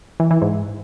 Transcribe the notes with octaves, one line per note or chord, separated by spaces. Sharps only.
E3
E3
G#2